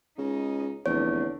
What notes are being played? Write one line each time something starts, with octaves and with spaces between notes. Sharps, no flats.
C#2 C#3 D#4
F1 E2 D3 D4 C#5